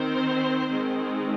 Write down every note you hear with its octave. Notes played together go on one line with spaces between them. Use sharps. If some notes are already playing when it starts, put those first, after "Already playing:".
Already playing: D#3 C4 C5
D#3 G#3 C4